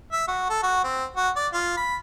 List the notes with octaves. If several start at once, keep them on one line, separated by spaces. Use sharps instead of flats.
E5
F#4
A4
F#4
C4
F#4
D5
F4
B5